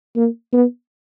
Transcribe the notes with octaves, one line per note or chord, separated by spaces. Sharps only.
A#3
B3